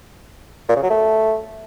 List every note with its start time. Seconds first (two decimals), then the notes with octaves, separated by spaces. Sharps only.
0.69 A#2
0.76 C#3
0.83 F#3
0.90 A3